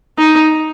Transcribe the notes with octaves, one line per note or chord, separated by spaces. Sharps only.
D#4